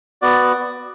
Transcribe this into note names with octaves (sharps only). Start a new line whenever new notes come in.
B3 F#4 D5